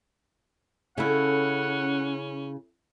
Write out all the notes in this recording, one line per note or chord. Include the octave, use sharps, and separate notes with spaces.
C#3 C#4 E4 A4 E5 F#5